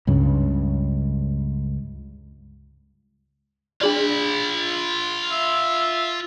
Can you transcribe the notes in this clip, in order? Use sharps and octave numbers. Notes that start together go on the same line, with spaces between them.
C#2 G2 C#3
D4 F4 G#4 D5 B5
E5